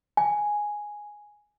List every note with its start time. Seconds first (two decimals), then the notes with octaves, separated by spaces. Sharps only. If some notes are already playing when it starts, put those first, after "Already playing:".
0.17 G#5